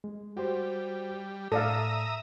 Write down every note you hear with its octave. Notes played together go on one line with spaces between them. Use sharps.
G#3
G3 F#4 G4 C5
A2 A4 D5 E5 F5 A#5 D#6